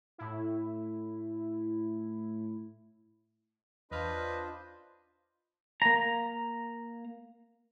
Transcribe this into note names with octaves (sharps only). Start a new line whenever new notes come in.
A2 E4
E2 D4 F4 B4 C5 D#5 F6
A#3 A#5